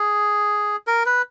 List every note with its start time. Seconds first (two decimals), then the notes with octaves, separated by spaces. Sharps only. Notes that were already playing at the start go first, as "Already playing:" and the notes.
Already playing: G#4
0.87 A#4
1.06 B4